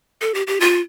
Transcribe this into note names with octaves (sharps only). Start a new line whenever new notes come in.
A4
G4
G4
F4